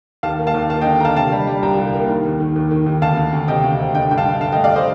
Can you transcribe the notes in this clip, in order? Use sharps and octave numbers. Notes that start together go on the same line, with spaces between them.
D#2 F5 A5
A#3
F5 A5
D#2
A#3 F5 A5
D#5 G5
D3
D3 F5 A5 A#5
C3 F5 A5
G3
G3
C2 G5 A#5
C2
A#3
D#3
D#2
D#3
D#2
D#3
D#2
D2 F5 A5
D2
D2
C3 D#5 G5
D2
C3
D3 D#5 G5
G2 G5
F5 A5
G2
D3 F5 A5
D#5 G5
A3
D5 F5
C5 D#5